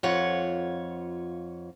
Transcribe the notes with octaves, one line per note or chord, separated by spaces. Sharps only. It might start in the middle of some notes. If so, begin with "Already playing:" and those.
F2 F4 C#5 F#5